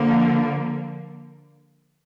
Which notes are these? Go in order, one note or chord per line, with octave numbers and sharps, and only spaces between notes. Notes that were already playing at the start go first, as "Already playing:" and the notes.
Already playing: D3 F3 A#3